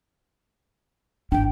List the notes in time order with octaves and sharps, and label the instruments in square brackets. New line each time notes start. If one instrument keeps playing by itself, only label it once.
[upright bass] G#1 E4 [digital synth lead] D4 [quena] G5